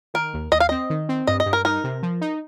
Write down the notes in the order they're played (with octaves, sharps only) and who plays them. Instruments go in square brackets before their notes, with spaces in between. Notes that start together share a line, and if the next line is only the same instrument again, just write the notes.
[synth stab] D#3 [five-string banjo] A#4
[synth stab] D#2
[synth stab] D#2 [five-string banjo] D#5
[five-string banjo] F5
[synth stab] C4 [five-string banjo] D#5
[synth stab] D#3
C4
[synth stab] G2 [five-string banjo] D#5
[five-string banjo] D#5
[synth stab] G2
[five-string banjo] A#4
[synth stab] D#4 [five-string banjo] A#4
[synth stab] C3
F3
D#4